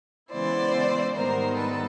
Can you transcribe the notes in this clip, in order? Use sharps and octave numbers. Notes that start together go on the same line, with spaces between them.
C#3 E3 G#3 B3 E4 C5 D5
G#2 D#3 G3 B3 D#4 A#4 C5
A4 B4